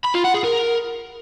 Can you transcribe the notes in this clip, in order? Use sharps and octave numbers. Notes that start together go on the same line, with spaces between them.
B5
F4
F#5
G#4
A#4